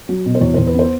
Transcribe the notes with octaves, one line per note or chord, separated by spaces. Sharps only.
F#3
B2
C5
E2 C#5
E2 C5
B4
B3 C5